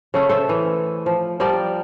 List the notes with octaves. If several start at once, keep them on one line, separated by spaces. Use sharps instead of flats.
C#3 A3 C#4
A4 C5 E5
E3
F3
F3 G3 A#4 D5